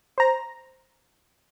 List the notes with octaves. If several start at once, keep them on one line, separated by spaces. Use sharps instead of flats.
C5 A#5